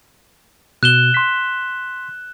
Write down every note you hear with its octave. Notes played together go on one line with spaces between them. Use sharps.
B2 F#6 E7 G7
C6 B6